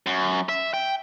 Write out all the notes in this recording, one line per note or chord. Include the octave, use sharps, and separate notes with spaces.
F#2
E5
G5